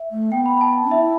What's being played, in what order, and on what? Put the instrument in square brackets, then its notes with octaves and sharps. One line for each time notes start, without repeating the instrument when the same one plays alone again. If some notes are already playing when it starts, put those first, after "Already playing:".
Already playing: [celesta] E5
[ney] A3
[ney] B3 [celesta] G5
[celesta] B5
B5
A5
[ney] E4 [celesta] E5